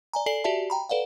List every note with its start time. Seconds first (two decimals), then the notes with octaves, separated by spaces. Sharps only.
0.13 D5 G#5 A#5
0.26 A4 D5 G#5 C7 F#7
0.44 F#4 G4 D5 E5 A5
0.70 G5 A#5 B5
0.89 A4 B4 D5 F5 F#5